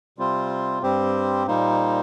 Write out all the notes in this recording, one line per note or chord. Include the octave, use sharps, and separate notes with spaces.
C3 G3 C4 F4 C5
G2 G3 C4 G4 C5
A#2 G3 A#3 D#4 C5